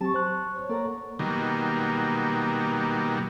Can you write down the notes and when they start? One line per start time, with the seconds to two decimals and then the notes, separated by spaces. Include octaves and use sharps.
0.01 F#3 C4 G4 A5 C#6
0.14 C5 F#6
0.55 C#5
0.69 A#3 A4 A#4 D5 F#5 A#5
1.19 B2 D#3 F#3 G3 A#3